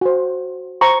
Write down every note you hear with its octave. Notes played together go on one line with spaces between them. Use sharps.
F#4 C5
C5 A#5 C#6